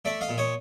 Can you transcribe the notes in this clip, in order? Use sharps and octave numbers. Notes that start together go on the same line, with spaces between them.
A3 D5 E5
D#5 F5
A#2
C#5 D#5